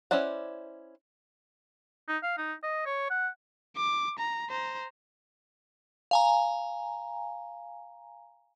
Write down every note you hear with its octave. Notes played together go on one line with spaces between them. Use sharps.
C#4 E4 C5 D5 F#5
D#4
F5
D#4
D#5
C#5
F#5
D6
A#5
C5 A#5
F5 G#5 A#5